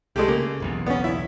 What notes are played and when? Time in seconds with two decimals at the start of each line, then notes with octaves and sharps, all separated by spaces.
0.16 C2 G#3 A3 G4
0.28 C#3 A#3
0.60 F#1 B1 E2
0.86 B3 C#4
1.04 E4